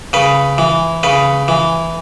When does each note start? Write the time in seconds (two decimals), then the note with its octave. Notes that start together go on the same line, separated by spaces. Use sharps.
0.13 C#3 B4
0.58 E3
1.03 C#3 B4
1.48 E3